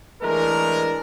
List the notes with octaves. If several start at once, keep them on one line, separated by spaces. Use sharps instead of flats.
E3 G#3 A3 D4 A#4